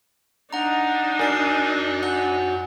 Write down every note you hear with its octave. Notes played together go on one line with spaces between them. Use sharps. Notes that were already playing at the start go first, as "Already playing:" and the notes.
D4 D#4 F#5 A#5
F#4 A#4 D5 G#5 C7
F#5 F#6